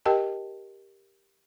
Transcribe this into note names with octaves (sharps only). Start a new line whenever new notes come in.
G4 A#4 D#5 G5 A5